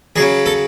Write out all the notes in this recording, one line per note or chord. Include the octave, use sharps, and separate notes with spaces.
C#3 F#3 G#4
A4